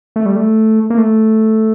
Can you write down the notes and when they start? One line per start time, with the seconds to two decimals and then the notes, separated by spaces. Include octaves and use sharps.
0.16 A3
0.26 G3
0.36 A3
0.90 A#3
0.98 A3